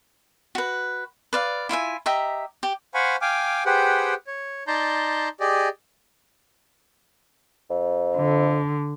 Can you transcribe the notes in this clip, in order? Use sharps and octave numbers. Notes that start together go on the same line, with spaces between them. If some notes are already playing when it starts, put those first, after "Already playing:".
F#4 B4
B4 D5 F5
E4 F4 E5 G#5
G4 D#5 E5 A#5
G4
C5 F5 F#5 G#5 B5 C#6
F5 G5 G#5 D6 F6
G4 G#4 B4 C5 F#5 G5
C#5
D#4 D5 A5 A#5 C6 G6
G4 G#4 D5 D#5
F2
D3